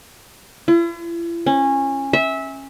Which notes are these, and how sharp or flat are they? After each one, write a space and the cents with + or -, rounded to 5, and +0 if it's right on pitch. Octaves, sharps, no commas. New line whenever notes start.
E4 +45
C#4 -20
E5 -20